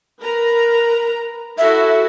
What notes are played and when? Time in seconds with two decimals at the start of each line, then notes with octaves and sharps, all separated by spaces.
0.18 A#4 B4 A#5
1.58 E4 F#4 A4 E5